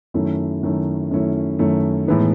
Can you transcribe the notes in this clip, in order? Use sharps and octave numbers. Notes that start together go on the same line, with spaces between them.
F#2 D#3 A3 C#4 E4
F#2 D#3 A3 C#4 E4
F#2 D#3 A3 C#4 E4
F#2 D#3 A3 C#4 E4
A2 E3 G#3 B3 D#4